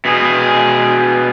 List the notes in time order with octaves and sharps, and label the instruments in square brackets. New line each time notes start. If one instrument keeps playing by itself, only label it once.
[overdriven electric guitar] B2 G#4